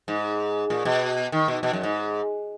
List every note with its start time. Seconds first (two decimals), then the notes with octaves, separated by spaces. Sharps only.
0.08 G#2
0.70 A#2
0.85 B2
1.32 D#3
1.48 B2
1.63 B2
1.73 F#2
1.83 G#2